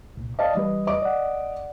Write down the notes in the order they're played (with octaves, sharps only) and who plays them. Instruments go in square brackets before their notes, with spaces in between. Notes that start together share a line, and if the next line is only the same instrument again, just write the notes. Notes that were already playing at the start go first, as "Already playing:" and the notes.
[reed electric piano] C2 A#2
[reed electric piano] D5 F5 A5 [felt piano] D#5
[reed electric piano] E3 G3 B4
[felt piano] D#5 D6
[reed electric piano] D5 F#5